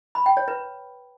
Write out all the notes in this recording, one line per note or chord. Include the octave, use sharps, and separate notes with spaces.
B5
G5
C#5
B4